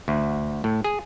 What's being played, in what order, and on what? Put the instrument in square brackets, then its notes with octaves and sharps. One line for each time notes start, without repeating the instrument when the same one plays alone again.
[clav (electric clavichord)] D2
A2
G#4